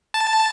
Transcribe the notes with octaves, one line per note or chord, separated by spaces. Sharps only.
A5